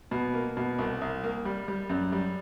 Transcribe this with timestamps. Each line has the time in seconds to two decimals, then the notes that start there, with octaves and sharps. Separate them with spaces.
0.11 B2
0.34 A#3
0.57 B2
0.79 C2
1.02 C2
1.24 A#3
1.45 G3
1.68 G3
1.89 F#2
2.12 G3